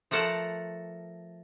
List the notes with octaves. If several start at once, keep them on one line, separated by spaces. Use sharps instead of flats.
F3 A3 A#4 F#5 A5